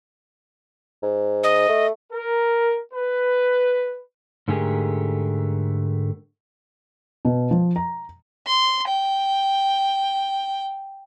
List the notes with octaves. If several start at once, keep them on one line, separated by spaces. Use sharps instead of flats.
G#2
D#5
A3
A#4
B4
G#2 D3 A3 G4 G#4 A#4
B2
F3
A#5
C6
G5